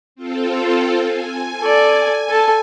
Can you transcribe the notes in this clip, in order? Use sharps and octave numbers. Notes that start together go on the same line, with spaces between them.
C4 F4 A4
G#5
A4 D5
A4 A5